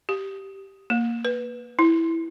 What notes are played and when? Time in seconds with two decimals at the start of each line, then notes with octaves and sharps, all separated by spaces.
0.09 G4
0.90 A#3
1.25 B4
1.79 E4